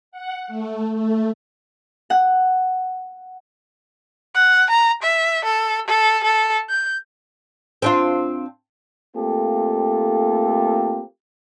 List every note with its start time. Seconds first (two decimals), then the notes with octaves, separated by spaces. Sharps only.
0.12 F#5
0.48 A3
0.95 A3
2.10 F#5
4.35 F#5
4.70 A#5
5.02 E5
5.45 A4
5.87 A4
6.24 A4
6.70 G6
7.82 C4 D4 F4
9.16 A3 A#3 C4 F4 G4 A4